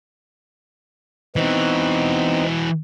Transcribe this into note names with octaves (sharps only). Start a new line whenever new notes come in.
E3 B3 C4 D#4 F#4